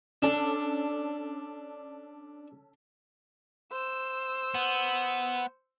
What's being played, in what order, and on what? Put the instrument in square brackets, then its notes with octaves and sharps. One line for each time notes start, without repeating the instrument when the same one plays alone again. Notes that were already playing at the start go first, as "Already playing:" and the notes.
[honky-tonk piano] C#4 A4 [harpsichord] D4
[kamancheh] C5 E6
[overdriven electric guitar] B3